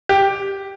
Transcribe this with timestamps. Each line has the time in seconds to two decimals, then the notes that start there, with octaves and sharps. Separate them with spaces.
0.09 G4